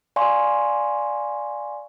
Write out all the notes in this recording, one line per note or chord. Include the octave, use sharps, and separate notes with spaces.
D5 F5 G#5 C6 C#6